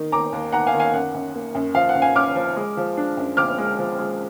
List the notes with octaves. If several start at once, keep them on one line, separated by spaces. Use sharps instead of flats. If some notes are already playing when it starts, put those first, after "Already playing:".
Already playing: D#3 D#4
D#3 A#5 D6
D#2
D#3 F#5 A#5
F5 G#5
D#3
F5 G#5
F#2 F#5
F#2
A#3
F#2
F3 F5
F#5
F#2
F5 G#5
F#2 D6 F6
F3
G#3
F3
D4
F#2
F3 D6 F6
G#3
F3
G#3